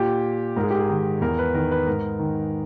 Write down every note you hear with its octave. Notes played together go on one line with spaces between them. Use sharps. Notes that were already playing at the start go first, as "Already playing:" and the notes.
Already playing: A#2 G4
G#2 A#4
G#4
G4
G#4
D#3
E2 A#4
B4
D#3 A#4
B4
G#2 A#4
D#3